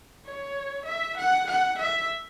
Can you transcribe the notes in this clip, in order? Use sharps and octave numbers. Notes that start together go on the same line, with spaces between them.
C#5
E5
F#5
F#5
E5